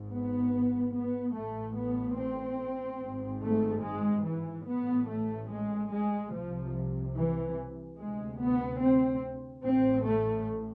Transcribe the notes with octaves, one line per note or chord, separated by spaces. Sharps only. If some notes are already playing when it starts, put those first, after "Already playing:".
Already playing: G#1 G#2
B3
B3
A1 A2 A3
B3
C4
G#1 G#2
A3
G#3
E3
A1 A2 B3
A3
G#3
G#3
C2 C3 F3
E3
D2 C3 G#3
B3
C4
A1 A2 C4
A3